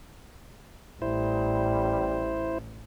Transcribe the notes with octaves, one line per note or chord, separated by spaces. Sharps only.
A1 G3 E4 C5